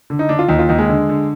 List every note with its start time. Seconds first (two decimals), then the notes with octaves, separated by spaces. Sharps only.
0.10 D3
0.19 D#4
0.29 D3 D4
0.39 F4
0.49 D#2 D#4
0.59 F4
0.69 D#2 D#4
0.78 G#3
0.89 D3
1.09 D3